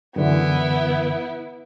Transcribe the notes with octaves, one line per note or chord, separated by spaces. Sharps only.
F#2 D3 E3 B3 E4